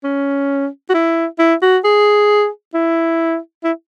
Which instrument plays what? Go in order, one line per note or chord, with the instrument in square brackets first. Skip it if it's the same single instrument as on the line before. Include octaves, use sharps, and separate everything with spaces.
[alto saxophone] C#4
F#4
E4
E4
F#4
G#4
E4
E4